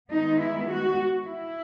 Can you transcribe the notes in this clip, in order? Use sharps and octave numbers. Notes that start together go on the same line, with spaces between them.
D#3 G#3 B3 D#4
E4
F#4
E4